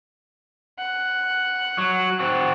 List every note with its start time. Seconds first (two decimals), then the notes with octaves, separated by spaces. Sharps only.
0.79 F#5
1.78 F#3
2.19 C4 F#4